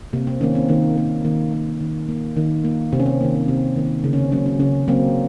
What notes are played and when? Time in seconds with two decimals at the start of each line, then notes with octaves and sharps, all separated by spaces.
0.13 C3 A#3
0.27 C4
0.41 D#3 A#3 C#4
0.55 C4
0.69 D#3 A#3
0.97 A#3
1.25 D#3 A#3
1.53 A#3
1.81 D#3
2.09 A#3
2.37 D#3
2.65 A#3
2.93 C3 C4
3.00 C#4
3.06 C4
3.21 A#3
3.24 D#3
3.35 C4
3.48 C3 C4
3.76 D#3 A#3
4.04 C#3 A#3
4.13 C#4
4.18 C4
4.32 F#3 A#3 C#4
4.46 C#4
4.59 C#3 C#4
4.88 F#3 A#3 C4